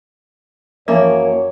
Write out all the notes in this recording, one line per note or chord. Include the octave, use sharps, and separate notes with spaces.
F#2 E3 F3 A#3 C#5